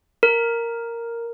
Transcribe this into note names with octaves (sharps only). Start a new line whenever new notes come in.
A#4